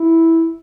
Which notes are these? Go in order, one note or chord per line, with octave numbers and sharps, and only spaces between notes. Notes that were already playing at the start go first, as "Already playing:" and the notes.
Already playing: E4